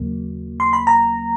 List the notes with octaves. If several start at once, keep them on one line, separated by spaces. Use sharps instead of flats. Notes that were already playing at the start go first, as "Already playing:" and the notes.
Already playing: D#2 C#3 F#3 A#3
C6
B5
A#5